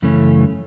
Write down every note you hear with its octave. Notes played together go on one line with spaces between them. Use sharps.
F#2 C#3 E3 A3 C#4